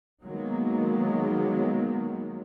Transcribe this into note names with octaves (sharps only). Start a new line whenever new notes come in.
D#3 F#3 G#3 A#3 B3